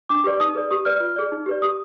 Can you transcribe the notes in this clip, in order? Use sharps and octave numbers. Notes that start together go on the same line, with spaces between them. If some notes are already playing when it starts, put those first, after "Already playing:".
D4 D6
G4 B4 D5
D#4 D#6
G#4 B4 D5
G4 D#6
B4 D5 F6
F4
G#4 D5
D#4
G4 B4 D5
G4 D#6